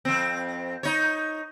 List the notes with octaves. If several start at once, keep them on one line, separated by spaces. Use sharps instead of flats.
F2 C4
D#4 C#5